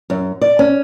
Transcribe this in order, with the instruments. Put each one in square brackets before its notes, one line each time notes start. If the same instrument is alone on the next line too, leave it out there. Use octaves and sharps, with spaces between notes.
[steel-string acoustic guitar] F#2
D5
C#4